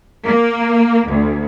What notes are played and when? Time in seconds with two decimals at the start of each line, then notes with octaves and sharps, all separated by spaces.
0.24 A#3
1.09 D2